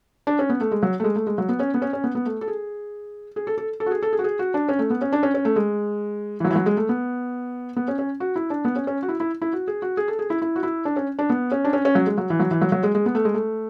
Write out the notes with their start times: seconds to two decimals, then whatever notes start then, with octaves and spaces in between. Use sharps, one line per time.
0.27 D4
0.39 C#4
0.50 B3
0.61 A3
0.72 G#3
0.83 F#3
1.00 A3
1.04 G#3
1.16 A3
1.27 G#3
1.38 F#3
1.49 B3
1.60 C#4
1.74 B3
1.82 C#4
1.93 C#4
2.04 B3
2.15 B3
2.26 A3
2.41 A4
2.48 G#4
3.36 G#4
3.47 A4
3.58 A4
3.80 A4
3.86 F#4
3.91 G#4
4.03 A4
4.13 G#4
4.19 F#4
4.24 G#4
4.39 F#4
4.54 D4
4.69 C#4
4.79 A3
4.90 B3
5.01 C#4
5.13 D4
5.23 C#4
5.34 C#4
5.45 A3
5.56 G#3
6.40 E3
6.45 F#3
6.50 E3
6.55 F#3
6.66 G#3
6.77 A3
6.89 B3
7.76 B3
7.88 C#4
7.99 C#4
8.20 F#4
8.36 E4
8.50 D4
8.65 B3
8.76 C#4
8.87 C#4
9.03 F#4
9.09 E4
9.20 E4
9.42 E4
9.53 F#4
9.68 G#4
9.82 F#4
9.97 G#4
10.08 A4
10.19 G#4
10.30 E4
10.42 E4
10.56 F#4
10.63 E4
10.85 D4
10.96 C#4
11.19 D4
11.30 B3
11.52 C#4
11.65 D4
11.73 C#4
11.85 C#4
11.95 F#3
12.07 G#3
12.18 F#3
12.30 E3
12.40 F#3
12.51 E3
12.62 F#3
12.72 F#3
12.83 G#3
12.95 G#3
13.06 B3
13.15 A3
13.25 G#3
13.34 A3